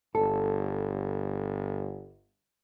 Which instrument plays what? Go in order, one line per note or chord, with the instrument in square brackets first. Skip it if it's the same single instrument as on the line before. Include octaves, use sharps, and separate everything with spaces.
[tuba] G1 [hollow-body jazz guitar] A4